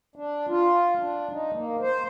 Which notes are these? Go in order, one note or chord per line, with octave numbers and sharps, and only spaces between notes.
D4
F4
D4
D#4
A#3
C5